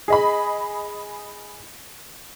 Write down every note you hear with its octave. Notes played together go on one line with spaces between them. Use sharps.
G#4 D#5 B5